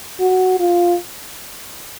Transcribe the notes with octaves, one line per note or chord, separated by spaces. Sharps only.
F#4
F4